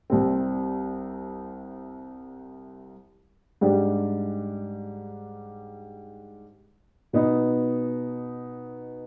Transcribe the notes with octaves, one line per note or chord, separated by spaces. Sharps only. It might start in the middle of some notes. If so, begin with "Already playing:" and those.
C2 C3 G3 C4
G#2 G3 D4 G4
B2 B3 D#4